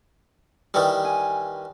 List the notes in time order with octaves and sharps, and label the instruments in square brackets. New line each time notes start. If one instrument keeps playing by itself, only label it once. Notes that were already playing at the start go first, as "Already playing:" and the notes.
[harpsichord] D#3 E3 G3
[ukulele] G#5